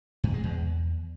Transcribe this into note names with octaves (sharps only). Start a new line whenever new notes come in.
G2
G#3
E2